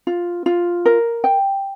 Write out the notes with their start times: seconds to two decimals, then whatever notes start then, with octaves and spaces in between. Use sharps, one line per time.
0.07 F4
0.46 F4
0.86 A#4
1.24 G5